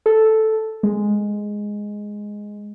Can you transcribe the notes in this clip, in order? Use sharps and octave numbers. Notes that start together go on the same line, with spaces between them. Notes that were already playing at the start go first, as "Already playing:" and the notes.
A4
G#3